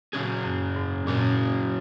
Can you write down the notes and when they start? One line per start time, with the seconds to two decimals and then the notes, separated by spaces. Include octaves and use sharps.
0.13 A#2 C#3 F#3 C#4 G#4
0.44 F#2
0.76 G#2
1.07 A#2 C#3 F#3 C#4 G#4